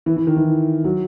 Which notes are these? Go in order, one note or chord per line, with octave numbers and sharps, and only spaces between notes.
E3
E3
D#3
E3
F#3